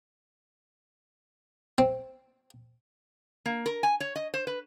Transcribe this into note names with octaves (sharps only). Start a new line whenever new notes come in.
C4
A#3
A#4
G#5
C#5
D#5
C5
B4